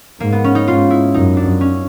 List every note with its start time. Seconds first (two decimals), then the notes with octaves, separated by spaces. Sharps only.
0.20 G#2 A#3
0.32 B3
0.44 C#4
0.55 D#4
0.68 G#2 F4
0.90 E4
1.14 F#2 D#4
1.37 D4
1.61 C#4